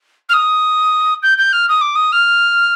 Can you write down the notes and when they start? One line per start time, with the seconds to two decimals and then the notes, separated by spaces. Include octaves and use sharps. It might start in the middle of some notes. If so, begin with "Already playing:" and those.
0.29 F6
0.33 D#6
1.23 G6
1.38 G6
1.52 F6
1.68 D#6
1.81 D6
1.95 D#6
2.12 F6